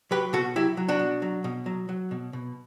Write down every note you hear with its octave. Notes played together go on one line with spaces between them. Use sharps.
F#3 G4 B4
B2 F#4 A4
F#3 E4 G4
F#3
D4 F#4
B2
F#3
B2
F#3
F#3
B2
B2